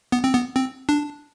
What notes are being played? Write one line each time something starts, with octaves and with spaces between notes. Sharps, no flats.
B3
C4
B3
C4
D4